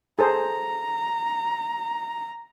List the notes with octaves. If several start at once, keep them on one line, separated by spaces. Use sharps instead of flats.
G#4 A4 C5 A#5